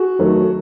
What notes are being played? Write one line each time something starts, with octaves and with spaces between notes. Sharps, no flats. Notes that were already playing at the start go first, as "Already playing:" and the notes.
Already playing: F#4 G#4
D#3 F#3 A3